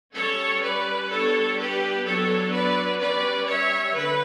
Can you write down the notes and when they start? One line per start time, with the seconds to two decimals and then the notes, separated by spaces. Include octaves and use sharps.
0.14 G3 C#4 A4 C#5
0.62 B4 D5
1.09 G3 B3 D4 A4 C#5
1.57 G4 B4
2.04 F#3 B3 D4 A4 C#5
2.51 B4 D5
2.99 G3 C#4 B4 D5
3.46 C#5 E5
3.93 D3 B4